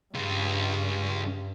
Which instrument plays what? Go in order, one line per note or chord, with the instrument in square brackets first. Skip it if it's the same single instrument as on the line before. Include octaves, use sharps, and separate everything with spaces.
[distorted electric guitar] C#2 [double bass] G2